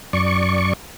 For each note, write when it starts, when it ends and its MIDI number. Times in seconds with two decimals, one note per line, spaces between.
0.13 0.73 42
0.13 0.73 74
0.13 0.73 85